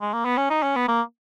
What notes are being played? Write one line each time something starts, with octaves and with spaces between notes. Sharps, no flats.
G#3
A#3
B3
C#4
D#4
C#4
B3
A#3